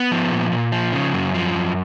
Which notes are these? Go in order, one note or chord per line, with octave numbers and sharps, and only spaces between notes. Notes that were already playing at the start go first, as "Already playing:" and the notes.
Already playing: B3
F3
A#2
A#2
F3
C#3
F#2
F3
F#2